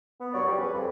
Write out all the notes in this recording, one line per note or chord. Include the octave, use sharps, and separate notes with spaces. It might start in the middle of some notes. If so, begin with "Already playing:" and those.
B3
C2 G2 F#3 C#5 D5
C#3 F3 G3
G#4 B4
F2